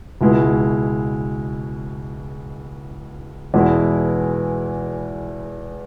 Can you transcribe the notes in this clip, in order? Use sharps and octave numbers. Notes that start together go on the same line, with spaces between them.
C#2 B2 G#3 E4
E2 B2 G#3 E4